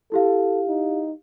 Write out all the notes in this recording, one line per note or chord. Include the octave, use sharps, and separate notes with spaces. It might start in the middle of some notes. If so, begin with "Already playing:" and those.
E4 G4 A4 F5
D#4